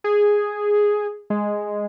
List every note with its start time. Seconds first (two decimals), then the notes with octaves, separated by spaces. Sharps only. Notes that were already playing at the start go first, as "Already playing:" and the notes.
0.04 G#4
1.30 G#3